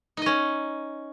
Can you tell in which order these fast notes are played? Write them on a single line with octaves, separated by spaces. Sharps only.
D#4 D#5 C#4